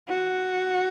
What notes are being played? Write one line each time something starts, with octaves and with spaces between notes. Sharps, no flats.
F#4